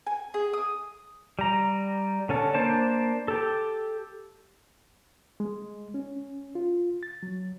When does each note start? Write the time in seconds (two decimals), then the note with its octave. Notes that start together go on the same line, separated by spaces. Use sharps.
0.07 G#5
0.34 G#4
0.53 D#6
1.39 G3 A#5
2.29 D3 C#4 A4
2.54 A#3 D4 C5 A5
3.28 G4 A4
5.40 G#3
5.94 C#4
6.55 F4
7.03 A6
7.23 F#3